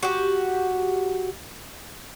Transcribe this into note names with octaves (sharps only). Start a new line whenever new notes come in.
F#4 G4